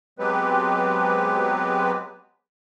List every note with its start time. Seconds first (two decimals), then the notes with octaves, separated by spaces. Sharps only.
0.19 F#3 G#3 B3 C4 G4 B4